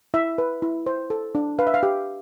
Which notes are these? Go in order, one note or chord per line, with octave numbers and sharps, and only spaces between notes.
E4 E5
B4
E4
C5
A4
D4
B4 F5
E5
F5
G4